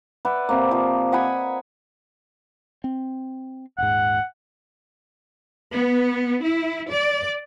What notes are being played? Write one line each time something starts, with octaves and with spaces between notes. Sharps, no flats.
B4 D5 E5 F#5
C3 A#3
F3
D#5 F#5 G#5 B5
C4
D#1 G#2 F#5
B3
E4
D5